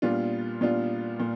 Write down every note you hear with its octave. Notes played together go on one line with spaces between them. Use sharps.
A#2 G3 B3 D4 F4
A#2 G3 B3 D4 F4
A#2